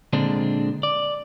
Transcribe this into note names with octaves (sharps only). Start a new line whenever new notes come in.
A#2 D3 G#3 C4 D4
D5